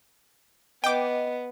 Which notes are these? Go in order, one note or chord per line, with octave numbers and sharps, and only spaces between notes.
B3 D#5 G5 D6